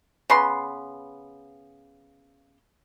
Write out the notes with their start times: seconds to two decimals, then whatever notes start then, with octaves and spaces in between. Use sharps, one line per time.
0.30 C#3 B3 C6